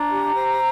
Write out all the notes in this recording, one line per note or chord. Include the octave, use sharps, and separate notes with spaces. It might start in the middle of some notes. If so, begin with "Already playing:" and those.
Already playing: D4 A#5
G4
C5